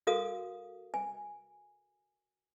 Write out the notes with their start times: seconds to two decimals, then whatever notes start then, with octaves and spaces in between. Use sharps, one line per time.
0.07 F#4 A4 A#4 F5 D#6
0.94 G#5